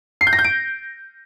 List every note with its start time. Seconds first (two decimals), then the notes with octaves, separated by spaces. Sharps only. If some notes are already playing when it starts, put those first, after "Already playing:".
0.21 C7
0.27 G6
0.33 A#6
0.39 G6
0.45 D7